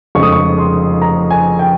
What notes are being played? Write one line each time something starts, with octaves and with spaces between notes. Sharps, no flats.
F1 F2 C#3 G#3 C#6
D#6
C#6
C6
A#5
G#5
G5